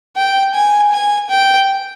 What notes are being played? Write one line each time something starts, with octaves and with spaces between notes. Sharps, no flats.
G5
G#5
G#5
G5